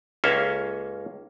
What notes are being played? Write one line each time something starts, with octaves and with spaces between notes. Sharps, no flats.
C#2 A#3 C#4 A4 E5 F5